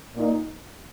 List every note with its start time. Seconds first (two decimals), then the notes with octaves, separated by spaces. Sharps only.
0.16 A#2 A#3 D#4